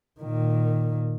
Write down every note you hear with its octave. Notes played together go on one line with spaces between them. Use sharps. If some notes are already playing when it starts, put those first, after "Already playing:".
A#2 D#3